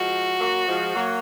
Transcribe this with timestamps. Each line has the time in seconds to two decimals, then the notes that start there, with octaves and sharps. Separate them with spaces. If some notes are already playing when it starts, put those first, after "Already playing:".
Already playing: F3 G#3 F#4
0.40 F#3 A#3
0.68 F3 G#3
0.94 F#3 A#3